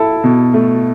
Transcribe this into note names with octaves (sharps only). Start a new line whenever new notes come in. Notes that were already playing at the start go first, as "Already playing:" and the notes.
Already playing: E4 A4
B2
A3